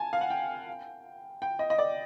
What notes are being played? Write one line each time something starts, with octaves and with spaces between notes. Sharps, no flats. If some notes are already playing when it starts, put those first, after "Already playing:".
Already playing: G#5 A5
F5
F#5
G5
G5
D#5
D#5
D5